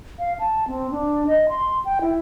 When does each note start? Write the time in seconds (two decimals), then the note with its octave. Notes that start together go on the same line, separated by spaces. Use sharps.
0.19 F5
0.39 A5
0.68 C4
0.91 D4
1.27 D#5
1.49 C6
1.85 G5
2.01 E4